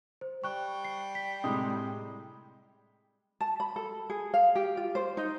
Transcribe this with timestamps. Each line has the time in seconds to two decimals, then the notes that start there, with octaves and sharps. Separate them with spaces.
0.21 C5
0.44 G3 C#6 F#6
0.85 C7
1.15 B6
1.44 A2 C3 G#3 B5 D#6
3.40 A5
3.60 B5
3.76 A4
4.10 G#4
4.34 F5
4.55 G4
4.77 F4
4.95 C5
5.17 D#4